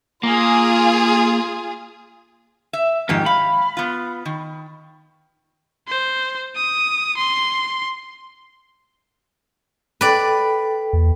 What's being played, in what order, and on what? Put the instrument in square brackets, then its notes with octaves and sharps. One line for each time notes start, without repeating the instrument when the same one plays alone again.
[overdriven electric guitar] A#3 [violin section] F4 G#4
[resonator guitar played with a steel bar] E5
[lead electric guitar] F2 G#2 [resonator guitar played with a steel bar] D#3 A#3 G4
[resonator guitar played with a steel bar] F5 [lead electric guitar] B5
[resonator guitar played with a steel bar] B3 F4
D#3
[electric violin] C5
D#6
C6
[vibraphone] A4 G5 [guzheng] B4 D5
[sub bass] E2